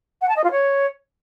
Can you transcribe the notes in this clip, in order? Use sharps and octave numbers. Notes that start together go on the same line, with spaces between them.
F#5
A5
D#5
F4
C#5